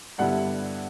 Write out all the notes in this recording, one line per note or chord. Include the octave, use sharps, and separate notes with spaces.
G2 D3 G3 B3 E4 F#5